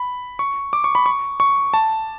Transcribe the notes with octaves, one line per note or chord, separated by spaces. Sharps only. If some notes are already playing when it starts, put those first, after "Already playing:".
Already playing: B5
C#6
D6
C#6
B5
C#6
C#6
A5